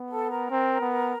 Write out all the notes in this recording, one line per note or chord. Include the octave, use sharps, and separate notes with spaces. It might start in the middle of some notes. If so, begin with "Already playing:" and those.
Already playing: B3
A4
A#4
C4
B3